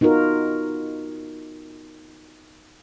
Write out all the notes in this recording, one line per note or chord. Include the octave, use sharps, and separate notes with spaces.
B3 D#4 F4 F#4 A#4